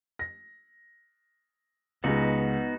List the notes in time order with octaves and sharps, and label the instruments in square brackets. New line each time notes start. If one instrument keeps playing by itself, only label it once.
[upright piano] A#6
[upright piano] C#2 G#3 [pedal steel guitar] B3 D#4 F#4